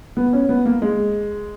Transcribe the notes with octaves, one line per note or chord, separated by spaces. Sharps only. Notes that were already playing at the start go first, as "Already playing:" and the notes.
B3
C#4
B3
A#3
G#3